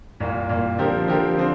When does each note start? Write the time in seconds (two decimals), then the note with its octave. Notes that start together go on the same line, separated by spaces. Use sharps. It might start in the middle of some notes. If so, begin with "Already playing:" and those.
0.20 C2 A#2 A#3
0.49 C2 A#2 A#3
0.78 D3 F3 C4 G4 A#4
1.07 D3 F3 C4 G4 A#4
1.37 D3 F3 C4